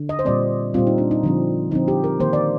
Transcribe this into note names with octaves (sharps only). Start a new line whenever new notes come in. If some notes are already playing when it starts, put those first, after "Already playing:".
Already playing: D3
D#5
C5
A#2 G3 C4 D5
A#2 G3 C4 F4
D#4
D4
D#4
D3 F3 C4
D3 F3 C4 D#4
G4
A#4
D#3 A#3 C5
D5